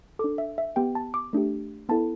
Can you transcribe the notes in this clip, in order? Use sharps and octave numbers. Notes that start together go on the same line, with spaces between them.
D4 A4 D6
E5
E5
B3 G4 G5
A5
D6
A3 D4 G4
B3 E4 A4 A5